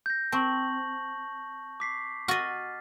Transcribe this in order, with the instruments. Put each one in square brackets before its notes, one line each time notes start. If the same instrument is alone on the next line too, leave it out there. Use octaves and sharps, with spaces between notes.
[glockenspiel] G6 A#6
[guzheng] C4 [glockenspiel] A5 C#6 F#7
[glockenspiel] D6 B6 C7
[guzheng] F#4 D#5 [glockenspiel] F6 A6